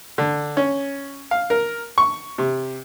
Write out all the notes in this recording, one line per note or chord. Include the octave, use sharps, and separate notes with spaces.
D3
C#4
F5
A#4
C#6
C3